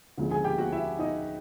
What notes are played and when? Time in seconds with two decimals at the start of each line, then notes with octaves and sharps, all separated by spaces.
0.17 D2 C#3 F3 G#3
0.31 G#4 G#5
0.44 G4 G5
0.58 F#4 F#5
0.72 E4 E5
0.99 D#4 D#5